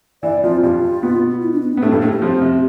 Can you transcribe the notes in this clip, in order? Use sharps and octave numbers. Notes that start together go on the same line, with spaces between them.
E3 E4 D5
F2 F3 F4
G2 G3 F4
B2 B3
E4
D4
B3
C4
B3
A2 A3 D4
G2 G3 A4
A2 A3 A4
G4
F2 F3
C3